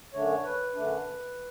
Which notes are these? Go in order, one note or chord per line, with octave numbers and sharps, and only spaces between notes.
F#2 D3 A3 D4 C#5
B4
F#2 D3 A3 D4